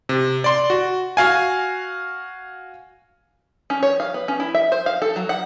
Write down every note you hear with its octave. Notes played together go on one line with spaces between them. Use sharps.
C3
D5 C6
F#4
F#4 F5 G#5
C#4
C#5
F5
B3
C#4
E4
E5
C5
F5
A4
F#3
F#5